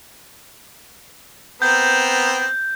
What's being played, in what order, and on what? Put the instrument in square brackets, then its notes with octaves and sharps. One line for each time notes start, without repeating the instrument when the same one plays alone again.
[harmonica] B3 C4 A#4 [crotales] G6